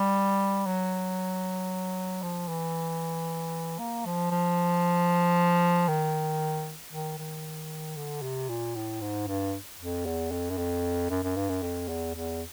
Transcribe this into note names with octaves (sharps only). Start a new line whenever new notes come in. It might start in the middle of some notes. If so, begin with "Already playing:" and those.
Already playing: G3
F#3
F3
E3
A#3
F3
F3
D#3
D#3
D#3
D3
C3
A#2
A2
G#2
G2
F2
E2
F2
F#2
F2
F#2
F#2
G2
F#2
F2
E2
E2